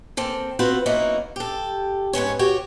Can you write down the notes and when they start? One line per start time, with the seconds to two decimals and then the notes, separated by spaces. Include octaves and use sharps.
0.17 A#3 C4 A4
0.59 C4 F4 F#4 B4 C5 F#5
0.86 F#2 A#3 B3 D#4 E4 F#4
1.36 G4 A4
2.13 G#2 B3 C#4 C#5
2.39 F#4 G4 C#5